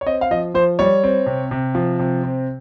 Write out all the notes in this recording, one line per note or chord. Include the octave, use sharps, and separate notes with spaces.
C#5
C4 D#5
F5
F3 D#5
F3 C5
G3 C#5
C4
C3
C3
F3
C3
C4